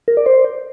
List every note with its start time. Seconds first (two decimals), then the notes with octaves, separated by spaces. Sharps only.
0.08 A#4
0.17 D5
0.26 C5